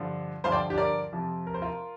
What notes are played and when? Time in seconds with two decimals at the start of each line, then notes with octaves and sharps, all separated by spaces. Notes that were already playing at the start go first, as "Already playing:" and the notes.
Already playing: G2 D3 F3
0.44 G2 D3 F3 C5 F5
0.52 D5 G5
0.70 D4 G4
0.78 A#4 D5
1.12 F2 C3 F3
1.47 A#4
1.54 C5
1.62 F4 A#4